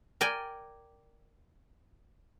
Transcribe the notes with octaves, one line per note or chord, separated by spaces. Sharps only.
A#4 D5 G5 G#5